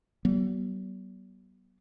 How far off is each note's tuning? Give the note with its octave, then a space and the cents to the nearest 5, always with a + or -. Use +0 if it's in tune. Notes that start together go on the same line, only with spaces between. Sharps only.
F#3 +45 B3 -25